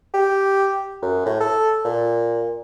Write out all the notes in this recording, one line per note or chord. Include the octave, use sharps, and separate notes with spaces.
G4
F#2
A2
A4
A#2